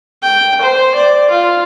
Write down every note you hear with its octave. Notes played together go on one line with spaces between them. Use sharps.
G5
C5
D5
F4